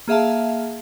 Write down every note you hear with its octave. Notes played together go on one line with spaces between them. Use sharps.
A#3 G#4 E5 F5 A5